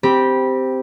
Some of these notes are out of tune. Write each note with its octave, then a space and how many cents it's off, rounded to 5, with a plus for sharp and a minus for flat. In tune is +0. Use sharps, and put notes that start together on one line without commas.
C4 -10 G4 +0 B5 -20